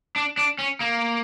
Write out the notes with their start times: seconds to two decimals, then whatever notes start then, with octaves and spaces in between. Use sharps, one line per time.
0.16 D4
0.37 D4
0.59 C#4
0.81 A#3